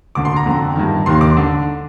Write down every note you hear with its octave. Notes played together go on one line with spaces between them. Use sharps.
D2 D3 D6
C6
A#5
F2 D3
G2 D#3
D#2 D#3 C6
D6
D3